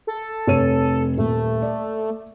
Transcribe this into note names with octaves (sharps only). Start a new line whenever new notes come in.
A4
F1 C#5 D#7
D#1 A3
D5